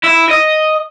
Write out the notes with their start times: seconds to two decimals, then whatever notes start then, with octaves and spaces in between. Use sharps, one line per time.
0.03 E4
0.30 D#5